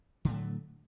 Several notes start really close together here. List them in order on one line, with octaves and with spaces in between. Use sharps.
D3 A2 A3 F#3